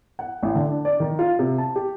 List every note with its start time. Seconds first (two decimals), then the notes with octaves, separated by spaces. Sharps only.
0.19 F#5
0.43 A1
0.55 D3
0.68 D4
0.85 D5
1.00 D#3
1.19 F4
1.39 C3
1.58 A5
1.76 G4